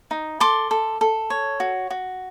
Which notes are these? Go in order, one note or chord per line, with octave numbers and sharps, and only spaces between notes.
D#4
A4 C6 D6
A4
A4
C#5
F#4
F#4